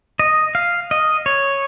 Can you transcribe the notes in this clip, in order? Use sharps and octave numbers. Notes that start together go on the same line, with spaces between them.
D#5
F5
D#5
C#5